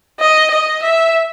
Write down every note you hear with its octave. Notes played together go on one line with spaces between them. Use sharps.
D#5
D#5
E5